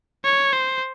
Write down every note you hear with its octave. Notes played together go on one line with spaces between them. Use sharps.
C#5
C5